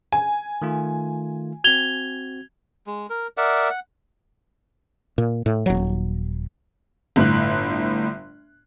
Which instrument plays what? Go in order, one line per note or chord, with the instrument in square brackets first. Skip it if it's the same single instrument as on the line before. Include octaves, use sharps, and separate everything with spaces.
[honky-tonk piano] G#5
[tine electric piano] D#3 A3 F4
[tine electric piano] C4 F#4 [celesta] G#6 F7 G7
[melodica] G#3
A#4
A#4 D5 E5 F#5
F#5
[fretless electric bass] A#2
A2
D#1 F#3
[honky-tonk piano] G1 A2 F#6